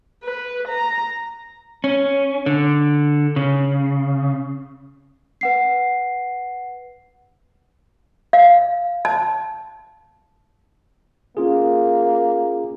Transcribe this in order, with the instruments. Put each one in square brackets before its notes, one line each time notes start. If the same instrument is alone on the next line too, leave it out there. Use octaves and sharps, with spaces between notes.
[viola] B4
A#5
[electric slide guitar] C#4
D3
C#3
[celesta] B4 F#5 C7
[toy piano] F5
A5
[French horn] A#3 [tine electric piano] C#4 F4 G#4